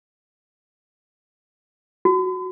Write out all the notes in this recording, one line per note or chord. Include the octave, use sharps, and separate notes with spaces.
F#4